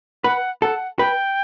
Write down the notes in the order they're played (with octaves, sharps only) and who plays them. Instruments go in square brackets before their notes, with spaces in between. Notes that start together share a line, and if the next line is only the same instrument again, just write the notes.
[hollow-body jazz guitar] B4 [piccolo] F#5
[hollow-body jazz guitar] A4 [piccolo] F#5
[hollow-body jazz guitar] B4 [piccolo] G5